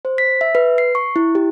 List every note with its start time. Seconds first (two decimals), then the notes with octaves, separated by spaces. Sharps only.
0.05 C5
0.18 B6
0.41 E5
0.55 B4
0.78 C7
0.95 C#6
1.16 E4
1.35 G4